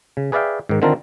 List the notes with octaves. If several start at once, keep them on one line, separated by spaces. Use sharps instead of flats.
C#3
G#4 B4 D5 E5 F5 G5
G#2 D#3
D3 D#3 C4 F4 A4 A#4